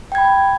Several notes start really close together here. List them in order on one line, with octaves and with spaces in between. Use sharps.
G5 G#6 B5